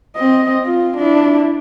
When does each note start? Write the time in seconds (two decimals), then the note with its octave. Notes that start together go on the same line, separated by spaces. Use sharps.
0.16 C4 D#5
0.64 F4
0.97 D4 E4